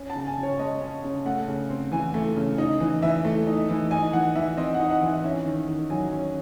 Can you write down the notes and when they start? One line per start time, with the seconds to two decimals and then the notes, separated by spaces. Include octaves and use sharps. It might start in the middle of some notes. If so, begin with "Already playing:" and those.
Already playing: C#4
0.10 A5
0.15 C#3
0.27 G#5
0.37 C#3
0.43 C#5
0.59 G#3 D#5
0.81 C#4
1.04 C#3
1.25 A3 F#5
1.48 C#3
1.70 C4
1.92 E3 G#5
2.14 A3
2.37 C#3
2.58 D#4
2.80 E3
3.02 E3 E5
3.25 A3
3.47 D#4
3.69 E3
3.91 D#4 G#5
4.13 E3 F#5
4.35 E3 E5
4.57 C4 D#5
4.74 F#5
4.80 D#4
4.91 F#5
5.02 E3
5.07 E5
5.24 C#4 E5
5.46 D#3
5.68 D#3
5.90 F#3 G#5
6.12 C#4